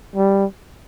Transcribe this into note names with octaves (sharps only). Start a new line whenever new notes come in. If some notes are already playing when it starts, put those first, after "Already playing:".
G3